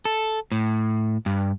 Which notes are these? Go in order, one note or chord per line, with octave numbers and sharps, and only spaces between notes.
A4
A2
G2